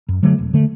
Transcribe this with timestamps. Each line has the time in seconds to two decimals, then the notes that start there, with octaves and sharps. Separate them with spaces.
0.09 F#2
0.23 D3 F#3 A3
0.38 E1
0.53 D3 A3